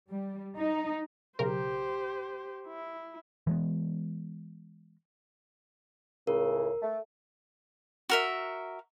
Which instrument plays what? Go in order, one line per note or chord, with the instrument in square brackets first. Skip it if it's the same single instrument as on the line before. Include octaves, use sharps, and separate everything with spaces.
[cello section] G3
D#4
[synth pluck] B1 C#3 A#4 [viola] G4 C5
[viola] E4
[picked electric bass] E3 G#3 B3
[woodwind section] C#2 A2 C#3 [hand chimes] A#4
[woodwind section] A3
[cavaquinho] F#4 A#4 E5